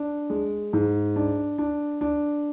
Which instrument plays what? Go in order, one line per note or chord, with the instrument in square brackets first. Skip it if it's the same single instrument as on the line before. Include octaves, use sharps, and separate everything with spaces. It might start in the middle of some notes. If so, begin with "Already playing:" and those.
Already playing: [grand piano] D4
G#3
G#2
D4
D4
D4